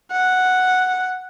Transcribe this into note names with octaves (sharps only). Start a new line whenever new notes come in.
F#5